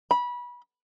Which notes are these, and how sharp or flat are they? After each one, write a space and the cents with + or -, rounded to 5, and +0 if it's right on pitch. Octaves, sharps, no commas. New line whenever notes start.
B5 -25